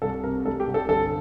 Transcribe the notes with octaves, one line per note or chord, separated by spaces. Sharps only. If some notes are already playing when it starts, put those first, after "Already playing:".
C2 A4
C3 A#4
G3 A4
G4
C2
A4
G1 A4